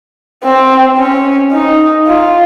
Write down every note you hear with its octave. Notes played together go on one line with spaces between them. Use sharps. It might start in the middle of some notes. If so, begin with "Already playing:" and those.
C4
C#4
D#4
F4